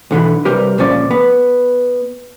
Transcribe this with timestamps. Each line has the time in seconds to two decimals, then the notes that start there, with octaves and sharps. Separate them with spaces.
0.11 B1 D3 E3 B5
0.45 C2 G3 G4 A#4 B4
0.78 C#2 A#2 F3 C#4 D5
1.11 B3